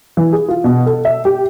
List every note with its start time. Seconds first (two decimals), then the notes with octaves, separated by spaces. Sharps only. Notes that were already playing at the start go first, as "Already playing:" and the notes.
0.17 E3
0.33 G#4
0.48 F4
0.64 B2
0.86 A4
1.05 E5
1.25 G4